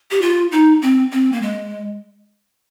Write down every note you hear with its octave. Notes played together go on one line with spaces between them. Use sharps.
G4
F4
D#4
C4
C4
A#3
G#3